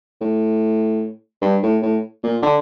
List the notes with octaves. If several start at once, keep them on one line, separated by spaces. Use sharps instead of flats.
A2
G2
A2
A2
A#2
D3